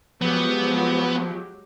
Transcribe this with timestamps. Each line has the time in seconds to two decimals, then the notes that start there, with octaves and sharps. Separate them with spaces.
0.22 F3 F#3 G#3 B3 G4